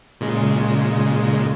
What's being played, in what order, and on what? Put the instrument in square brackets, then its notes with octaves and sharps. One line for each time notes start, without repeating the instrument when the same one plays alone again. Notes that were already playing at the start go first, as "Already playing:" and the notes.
[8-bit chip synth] A#2 C#3 G#3